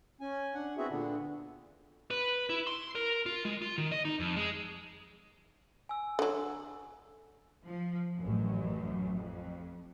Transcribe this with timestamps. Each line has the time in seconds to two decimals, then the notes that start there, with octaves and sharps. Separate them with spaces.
0.21 C#4 G#5
0.54 D4 F#5
0.78 B3 C4 E4 F#4 G#4 E5
0.90 A#2 D3 B3 D4
2.11 B4
2.50 E4
2.67 C6
2.95 A#4
3.26 F4
3.45 G#3
3.62 F4
3.78 D#3
3.92 D#5
4.05 D#4
4.20 F2
4.36 G#3
5.89 G#5 E6
6.19 D3 F#3
7.64 F3
8.18 A1 F#2
9.15 F2